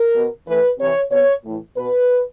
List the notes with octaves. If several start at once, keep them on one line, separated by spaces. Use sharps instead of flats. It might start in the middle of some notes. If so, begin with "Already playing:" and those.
Already playing: A#4
B2
A2 E3 B4
C3 E3 C#5
B2 C#5
A2 E3
B2 B4